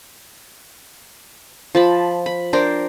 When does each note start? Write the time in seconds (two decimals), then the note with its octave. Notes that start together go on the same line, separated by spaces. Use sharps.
1.75 F3 A5 B5
2.26 B5
2.53 D4 A#4 C5 G5